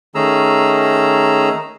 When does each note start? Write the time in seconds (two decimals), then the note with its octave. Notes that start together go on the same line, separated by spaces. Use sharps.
0.15 D#3 A3 C#4 G#4 A#5 E6